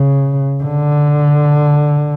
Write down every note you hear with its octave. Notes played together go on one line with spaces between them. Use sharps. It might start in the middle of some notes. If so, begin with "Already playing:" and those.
Already playing: C#3
D3